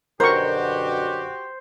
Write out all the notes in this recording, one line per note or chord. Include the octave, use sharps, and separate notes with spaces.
F#2 B2 D3 F#4 G4 A#4 C5 C#6